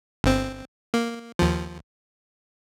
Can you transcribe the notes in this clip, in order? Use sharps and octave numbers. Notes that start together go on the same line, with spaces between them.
G1 C4
A#3
D#2 F3